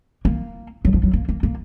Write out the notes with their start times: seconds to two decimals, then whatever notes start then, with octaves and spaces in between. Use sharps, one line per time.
0.25 A#3
0.85 F#3
0.94 F3
1.03 F#3
1.13 A#3
1.29 A#3
1.43 A#3